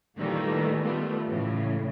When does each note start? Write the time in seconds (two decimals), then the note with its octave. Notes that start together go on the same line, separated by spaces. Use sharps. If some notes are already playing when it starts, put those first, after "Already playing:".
0.17 A#2 D#3 E3 G3 A3 A#3
0.81 G3 A3 B3 F4
1.27 A2 C#3 E3